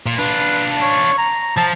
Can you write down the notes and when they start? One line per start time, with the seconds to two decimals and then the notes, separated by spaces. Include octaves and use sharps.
0.06 A#2
0.18 D4 F4 B4
0.81 C#5
1.18 A#5
1.57 F3 A5